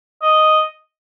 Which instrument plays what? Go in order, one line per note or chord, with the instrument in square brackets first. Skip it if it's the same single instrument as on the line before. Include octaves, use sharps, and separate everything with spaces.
[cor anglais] D#5